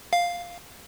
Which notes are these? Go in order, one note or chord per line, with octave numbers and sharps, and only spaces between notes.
F5